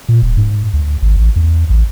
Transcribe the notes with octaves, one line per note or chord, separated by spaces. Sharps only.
A#2
D#1
G#2
D2
G#1
A1
E2
A1